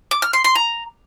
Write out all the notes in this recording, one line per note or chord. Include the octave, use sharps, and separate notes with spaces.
D6
F6
C6
C6
A#5